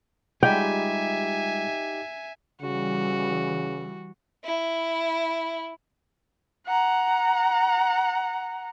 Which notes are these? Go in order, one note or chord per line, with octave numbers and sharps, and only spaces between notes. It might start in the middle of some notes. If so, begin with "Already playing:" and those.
G3 G#3 D#4 F4 G4 E5 G5 G#5
C#3 E3 G3 F#4
E4
F#5 A#5